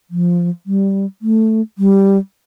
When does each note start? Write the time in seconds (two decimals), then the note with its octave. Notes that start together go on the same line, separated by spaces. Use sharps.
0.11 F3
0.66 G3
1.22 A3
1.78 G3